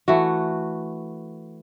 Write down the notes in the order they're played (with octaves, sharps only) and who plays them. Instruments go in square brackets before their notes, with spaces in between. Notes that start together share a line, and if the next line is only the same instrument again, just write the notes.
[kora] E3 A3 F#4